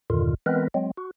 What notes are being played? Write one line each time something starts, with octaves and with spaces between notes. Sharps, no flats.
E2 G2 A#2 D3 D#3 F4
E3 G#3 B3 C4 A#4 B4
F#3 G#3 C4
F#4